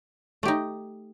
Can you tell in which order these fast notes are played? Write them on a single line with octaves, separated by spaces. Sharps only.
A3 G4 D#4